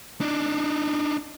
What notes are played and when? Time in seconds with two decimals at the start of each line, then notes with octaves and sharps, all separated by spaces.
0.21 D4 D#4